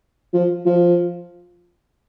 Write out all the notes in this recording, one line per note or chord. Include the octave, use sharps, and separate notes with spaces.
F3
F3